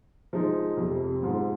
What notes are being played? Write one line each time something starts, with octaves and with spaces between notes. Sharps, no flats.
F3 G#3 D#4
F2 C3 G3
G#2 F3 G#3